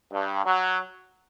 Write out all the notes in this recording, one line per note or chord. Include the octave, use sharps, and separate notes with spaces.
G2
F#3